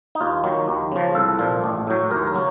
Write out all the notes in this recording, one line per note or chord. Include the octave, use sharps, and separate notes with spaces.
D#4
D#2 F4
D#3 F#3
D#2
C#3 F3
C2 A4
A#2 F3
A1
A2 F#3
D#2 A#4
A#4
C#3 F#3